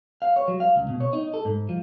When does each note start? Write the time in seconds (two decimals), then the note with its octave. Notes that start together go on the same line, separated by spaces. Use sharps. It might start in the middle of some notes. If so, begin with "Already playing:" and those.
0.22 F5
0.36 C#5
0.48 F#3
0.60 F5
0.76 C#2
0.89 B2
1.00 C#5
1.13 D#4
1.34 A4
1.45 G#2
1.69 F3